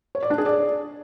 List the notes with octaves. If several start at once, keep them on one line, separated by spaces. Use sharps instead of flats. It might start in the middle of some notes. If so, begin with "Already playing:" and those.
C#5
D5
D4
G#4
D5